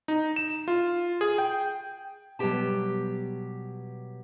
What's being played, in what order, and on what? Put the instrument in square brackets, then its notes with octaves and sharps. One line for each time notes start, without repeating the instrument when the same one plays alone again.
[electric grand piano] D#4
E7
F4
G#4
G5
[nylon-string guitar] B2 F#3 G3 B3 G4 A5